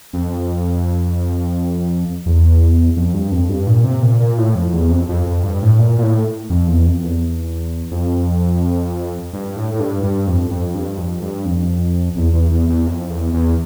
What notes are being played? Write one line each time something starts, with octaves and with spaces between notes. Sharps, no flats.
F2
E2
F2
G2
F2
G2
A#2
C3
A#2
A#2
A2
F2
E2
F2
F2
F2
G2
A2
A#2
A#2
A2
F2
E2
F2
E2
F2
G2
A2
A2
G2
G2
F2
F2
G2
F2
G2
F2
E2
E2
E2
E2
F2
E2
E2